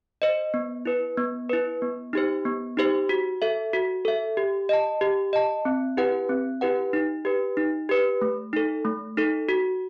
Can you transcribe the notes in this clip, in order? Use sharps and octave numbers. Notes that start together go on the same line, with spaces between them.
C5 D#5
B3
E4 B4
B3
E4 B4
B3
D#4 G4 C5
B3
D#4 G4 C5
F#4
A4 E5
F#4
A4 E5
G4
D#5 A5
G4
D#5 A5
C4
E4 G4 B4 F#5
C4
E4 G4 B4 F#5
D#4
G4 B4
D#4
G4 B4
A3
D#4 A4
A3
D#4 A4
F#4